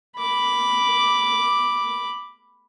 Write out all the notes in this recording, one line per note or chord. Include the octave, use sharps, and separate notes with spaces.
B5 D6